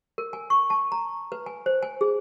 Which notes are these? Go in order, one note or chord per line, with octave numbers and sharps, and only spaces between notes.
A#4
G#5
C#6
A5
A#5
B4
G#5
C5
G#5
G#4